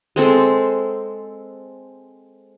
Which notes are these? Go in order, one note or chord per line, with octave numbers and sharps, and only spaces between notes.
G#3 C4 A4